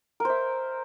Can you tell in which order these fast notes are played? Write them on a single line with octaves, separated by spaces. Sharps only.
A#4 C5 E5